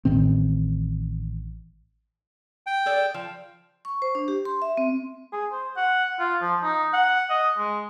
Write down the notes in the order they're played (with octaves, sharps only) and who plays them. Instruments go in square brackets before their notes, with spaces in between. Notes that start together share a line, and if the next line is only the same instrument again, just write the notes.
[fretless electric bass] A1 A2 D#3 C4
[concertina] G5
[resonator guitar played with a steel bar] G#4 A4 D5
F3
[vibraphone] C#6
C5
D4
G4
C6
E5
C4
[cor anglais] G#4
C5
F#5
F4
F3
D#4
F#5
D#5
G#3